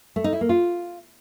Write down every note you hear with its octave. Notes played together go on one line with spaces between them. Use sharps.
A3
D#4
E4
A#3
F4